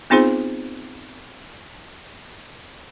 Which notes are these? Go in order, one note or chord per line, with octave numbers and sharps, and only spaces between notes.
B3 C4 D#4 F4 G#4 C5